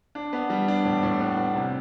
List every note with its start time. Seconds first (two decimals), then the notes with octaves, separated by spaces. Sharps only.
0.15 D4
0.33 B3
0.50 G3
0.68 D4
0.85 A2
1.03 A2
1.20 B3
1.37 B3
1.55 C3